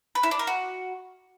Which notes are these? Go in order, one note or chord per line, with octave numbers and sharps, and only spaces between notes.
B4
E4
D4
A#4
F#4